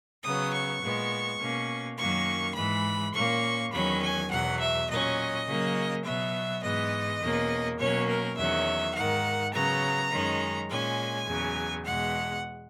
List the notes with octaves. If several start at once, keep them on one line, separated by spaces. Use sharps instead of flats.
C#3 F#3 B3 D#6
C#6
A#2 G#3 B3
B2 A#3 C#4
F#2 D#3 F#3 A#3 C#4 C#6
G#2 E3 G#3 B5
A#2 A#3 C#4 C#6
E2 D#3 F#3 C#4 B5
G#5
E2 B2 F#3 F#5
E5
A#2 F#3 C#4 D#5
C#3 F#3 A#3 C#4
B2 F#3 B3 E5
G#2 E3 G#3 B3 D#5
E2 B2 A#3 C#4
B2 F#3 A#3 C#4 C#5
A#4
E2 D#3 F#3 C#4 E5
G#2 D#3 A#3 F#5
C#3 F#3 B3 A#5
F#2 D#3 G#3 C#4
A#2 G#3 C#4 G#5
E2 C#3 F#3
E2 B2 G#3 F#5